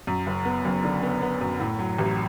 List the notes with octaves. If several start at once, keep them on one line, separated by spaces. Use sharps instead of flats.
F#2
F#1
B3
F#1
D3
B3
B3
F#2
A2
F#3
A1